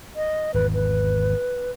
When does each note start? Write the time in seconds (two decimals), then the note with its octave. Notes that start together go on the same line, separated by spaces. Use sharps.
0.16 D#5
0.54 G#1 E2 B4
0.74 B4